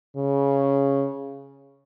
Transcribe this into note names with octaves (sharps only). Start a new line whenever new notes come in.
C#3